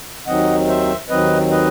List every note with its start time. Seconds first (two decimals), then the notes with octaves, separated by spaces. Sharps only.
0.27 D#2 D#3 F#3 C4 D#5 F#5
0.68 C5 E5
1.09 D#2 D#3 F#3 C4 B4 D#5
1.51 B4 D#5